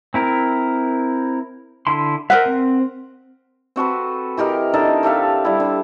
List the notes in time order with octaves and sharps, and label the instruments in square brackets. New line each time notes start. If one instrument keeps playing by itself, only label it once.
[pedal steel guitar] C4 E4 A#4
D3 E4 C6
[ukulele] A#4 C5 F#5 [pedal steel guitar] D#5 E5
[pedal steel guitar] C4
[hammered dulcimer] C4 F#4 A4 B4
E3 G4 A#4 D#5
D3 D#4 A4 A#4
G4 A4 E5 F5
G3 E4
D3